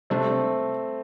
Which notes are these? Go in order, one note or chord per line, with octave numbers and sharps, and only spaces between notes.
C3 G3 A3 C4 D4